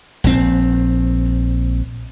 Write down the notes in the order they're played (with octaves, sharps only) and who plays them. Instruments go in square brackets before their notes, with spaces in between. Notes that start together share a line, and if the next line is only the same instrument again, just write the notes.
[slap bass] A#1 C4